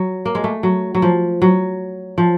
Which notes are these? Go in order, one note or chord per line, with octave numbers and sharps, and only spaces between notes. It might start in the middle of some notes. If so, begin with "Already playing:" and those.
Already playing: F#3
A#3
G#3
A3
F#3
F#3
F3
F#3
F3